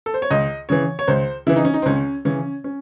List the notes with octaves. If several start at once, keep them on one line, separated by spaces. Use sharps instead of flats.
A4
C5
C#5
C#2 D#5
C#3 E3 C#5
C#5
C#2 C5
C#3 E3 E4
D#4
C#4
D#4
C4
C#2 C#4
C#3 E3 C#4
C#4